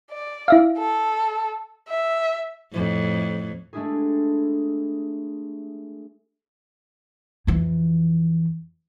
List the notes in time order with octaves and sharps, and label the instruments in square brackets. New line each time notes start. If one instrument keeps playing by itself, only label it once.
[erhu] D5
[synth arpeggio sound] E4 E5 F5
[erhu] A4
E5
[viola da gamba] F2 A2
[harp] G#3 A3 D4 E4 G4 G#4
[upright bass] F2 E3